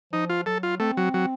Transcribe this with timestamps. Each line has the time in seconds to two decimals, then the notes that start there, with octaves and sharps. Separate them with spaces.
0.13 F3 D#4
0.29 F4
0.46 F#3 A4
0.63 F4
0.80 A3 C4
0.97 F#3
1.14 F#3